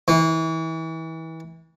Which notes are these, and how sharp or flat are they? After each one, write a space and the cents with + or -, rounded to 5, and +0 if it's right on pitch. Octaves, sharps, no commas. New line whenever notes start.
E3 -30